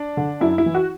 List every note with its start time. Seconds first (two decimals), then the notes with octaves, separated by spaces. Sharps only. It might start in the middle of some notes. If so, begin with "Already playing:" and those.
Already playing: D4
0.17 D3
0.41 F#2 E4
0.58 E4
0.66 E3
0.74 F#4